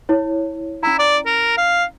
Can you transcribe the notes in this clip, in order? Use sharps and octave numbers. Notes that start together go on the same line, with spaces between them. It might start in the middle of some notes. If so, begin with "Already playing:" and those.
E4 C#5
C#4 E4 A#5
D5
A#4
F5